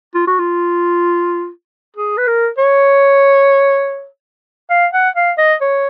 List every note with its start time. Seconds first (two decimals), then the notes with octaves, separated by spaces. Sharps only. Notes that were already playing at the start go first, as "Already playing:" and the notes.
0.15 F4
0.27 F#4
0.39 F4
1.96 G#4
2.18 B4
2.28 A#4
2.58 C#5
4.70 F5
4.93 F#5
5.16 F5
5.38 D#5
5.61 C#5